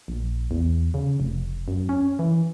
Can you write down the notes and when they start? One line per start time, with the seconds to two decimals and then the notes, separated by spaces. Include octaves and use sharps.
0.08 A#1
0.51 E2
0.94 C#3
1.20 F1
1.68 F#2
1.89 C#4
2.19 E3